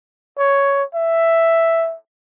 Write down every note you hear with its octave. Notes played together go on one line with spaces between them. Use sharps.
C#5
E5